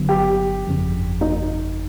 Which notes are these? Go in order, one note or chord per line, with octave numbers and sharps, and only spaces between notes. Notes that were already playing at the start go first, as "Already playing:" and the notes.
Already playing: G1 G2 D3 F#3 B3
G4
G1 F2 C#3
D#4